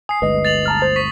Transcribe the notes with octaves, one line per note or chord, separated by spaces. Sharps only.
G#5 D#6 C7
G1 D2 G#3 B4 D#5
A6 F7 F#7
A5 A#5 F6
C5
C#6 B6